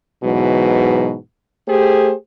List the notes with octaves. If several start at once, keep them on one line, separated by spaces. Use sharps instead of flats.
G#2 B2 E3 F#3
A3 G4 G#4 C5